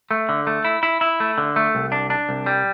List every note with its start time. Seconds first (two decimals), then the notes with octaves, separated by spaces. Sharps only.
0.11 A3
0.29 D3
0.47 A3
0.65 E4
0.83 E4
1.01 E4
1.20 A3
1.38 D3
1.56 A3
1.75 C2
1.92 D4
2.10 D4
2.29 C2
2.46 G3